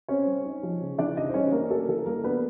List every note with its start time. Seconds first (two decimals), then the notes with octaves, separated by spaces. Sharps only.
0.09 C4 C#4 C#5
0.27 G3
0.45 D#4
0.63 F3
0.81 C#3
0.98 E3 D4 D5
1.16 C#3 D#4 D#5
1.29 C5
1.34 G3 C#4 C#5
1.52 A#3 D4 A#4
1.70 A3 A4
1.88 E3 A4
2.06 G3 A#3 A#4
2.24 B3 D4 B4